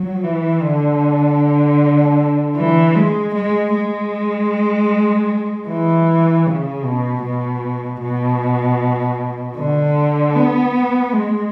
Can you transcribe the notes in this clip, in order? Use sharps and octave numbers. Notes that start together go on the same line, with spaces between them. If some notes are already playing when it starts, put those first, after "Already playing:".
Already playing: F#3
E3
D3
E3
G#3
G#3
G#3
E3
C#3
B2
B2
B2
D3
B3
G#3